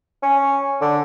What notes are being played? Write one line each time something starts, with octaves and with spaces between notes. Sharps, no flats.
C#4
D3